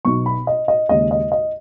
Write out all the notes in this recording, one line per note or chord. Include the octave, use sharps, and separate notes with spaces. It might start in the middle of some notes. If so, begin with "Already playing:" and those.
B1 B2 B3 D#4 C#6
B5
D#5
D#5
D#2 C#3 G#3 D#5
D#5
D#5